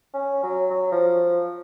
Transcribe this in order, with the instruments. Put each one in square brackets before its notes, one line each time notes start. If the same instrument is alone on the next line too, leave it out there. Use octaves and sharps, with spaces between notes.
[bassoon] C#4
F#3
F#3
F3